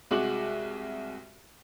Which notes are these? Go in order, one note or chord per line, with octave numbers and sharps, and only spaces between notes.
C2 G#3 F#4 D6 F#7